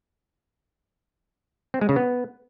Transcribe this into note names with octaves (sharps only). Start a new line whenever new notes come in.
C4
G#3
C#3
B3